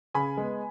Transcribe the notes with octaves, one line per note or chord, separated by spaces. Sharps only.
C#3 G#5 B5
G#3 B3